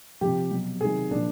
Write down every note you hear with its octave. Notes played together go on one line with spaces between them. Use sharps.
C3 F3 G4
B2 F#3
C3 D#3 F#3 G#4
A#2 F3 D4